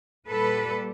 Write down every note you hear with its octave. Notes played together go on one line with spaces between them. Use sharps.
A#2 G3 A4 B4